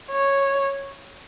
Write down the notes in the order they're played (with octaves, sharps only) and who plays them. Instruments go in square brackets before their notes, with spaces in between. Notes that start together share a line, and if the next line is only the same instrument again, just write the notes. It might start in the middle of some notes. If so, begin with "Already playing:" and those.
[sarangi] C#5